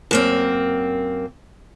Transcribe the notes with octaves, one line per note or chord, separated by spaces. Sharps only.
F#2 A#3 C4